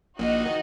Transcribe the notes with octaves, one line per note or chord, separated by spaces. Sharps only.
A#1 A#2 D#4 F#4 D#5
D#3